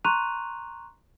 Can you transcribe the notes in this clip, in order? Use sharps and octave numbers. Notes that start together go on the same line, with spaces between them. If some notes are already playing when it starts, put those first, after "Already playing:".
A#5 C6 C#6 F#6 D#7 F7